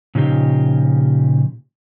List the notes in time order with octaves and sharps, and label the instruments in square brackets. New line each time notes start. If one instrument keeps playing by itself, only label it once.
[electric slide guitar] A#2 C#3 F3 D#4 G4